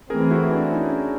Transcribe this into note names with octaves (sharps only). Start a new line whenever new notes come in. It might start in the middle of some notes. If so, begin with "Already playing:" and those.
E3 A3 C4 G#4 A#4
E4 F#4
D4 E4
C#4 D#4